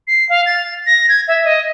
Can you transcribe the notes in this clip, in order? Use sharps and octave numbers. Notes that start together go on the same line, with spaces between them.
C7
F5
A6
A#6
G#6
E5
D#5